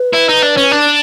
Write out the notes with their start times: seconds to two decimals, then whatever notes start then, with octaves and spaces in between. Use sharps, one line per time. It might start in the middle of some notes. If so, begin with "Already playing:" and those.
Already playing: B4
0.14 E4
0.29 D#4
0.42 D4
0.57 C#4
0.71 D4